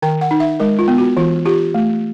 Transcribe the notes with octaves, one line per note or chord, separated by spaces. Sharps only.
D#3 G5
F#5
D#4
E5
G#3 A#4
F4
B3
F#4
E3 F4
F4 G4
A3